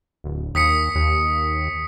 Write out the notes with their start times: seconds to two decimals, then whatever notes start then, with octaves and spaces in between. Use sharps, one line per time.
0.24 D1
0.55 D#2 D#6 B6 C#7
0.95 D#2